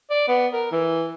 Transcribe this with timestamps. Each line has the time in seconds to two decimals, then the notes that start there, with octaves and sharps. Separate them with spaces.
0.10 D5
0.28 B3
0.53 A#4
0.72 E3